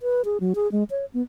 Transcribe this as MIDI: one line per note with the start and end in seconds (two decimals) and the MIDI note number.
0.02 0.22 71
0.25 0.38 68
0.40 0.53 54
0.55 0.70 68
0.72 0.84 56
0.90 1.05 73
1.14 1.22 59